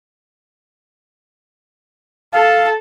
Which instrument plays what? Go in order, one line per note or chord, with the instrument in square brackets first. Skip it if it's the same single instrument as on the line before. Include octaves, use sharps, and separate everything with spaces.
[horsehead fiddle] A4 A5 [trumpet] F5